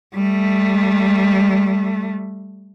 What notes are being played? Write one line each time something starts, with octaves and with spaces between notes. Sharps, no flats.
G3 A3